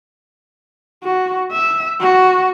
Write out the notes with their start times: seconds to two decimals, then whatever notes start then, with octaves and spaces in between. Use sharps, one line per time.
1.04 F#4
1.52 E5
2.01 F#4